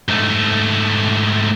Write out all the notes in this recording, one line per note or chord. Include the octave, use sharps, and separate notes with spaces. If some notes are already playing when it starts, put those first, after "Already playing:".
G#2 A3